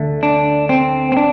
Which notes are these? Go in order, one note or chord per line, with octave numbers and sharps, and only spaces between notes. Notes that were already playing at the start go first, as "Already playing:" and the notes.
Already playing: D2 D3 A3
D4
C4
C4
D4